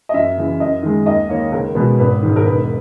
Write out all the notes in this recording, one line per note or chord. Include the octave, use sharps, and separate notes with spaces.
D#5
F#2 E5
C#3 E3
F#2 D#5
D#3 G#3
D#2 D#5
D#3 A#3 C#5
C#2 A#4
B2 G#3 B3
G#1 B4
G#2 D#3
A#4
E1 B4